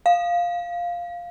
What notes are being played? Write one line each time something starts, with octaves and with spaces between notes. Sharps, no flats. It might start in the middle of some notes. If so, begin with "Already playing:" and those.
F5